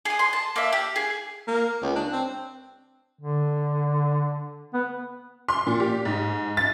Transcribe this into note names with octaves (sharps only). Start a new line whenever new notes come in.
G#4 D#6
C6
A5
A#3 E5
G4
G#4
A#3
C#2
D4
C4
D3
B3
C6
A#2
G4
G#2
A6